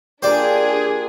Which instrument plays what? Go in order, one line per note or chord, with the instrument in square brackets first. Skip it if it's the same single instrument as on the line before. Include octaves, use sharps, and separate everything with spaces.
[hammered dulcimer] A#3 F4 G4 [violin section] D4 G#4 [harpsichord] C5 D5